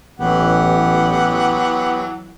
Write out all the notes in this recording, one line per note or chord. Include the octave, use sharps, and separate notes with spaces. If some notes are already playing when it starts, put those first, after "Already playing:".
A1 E3 F#3 B3 G4 F#5